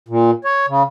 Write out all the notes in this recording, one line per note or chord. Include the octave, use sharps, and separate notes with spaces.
A#2
C#5
C#3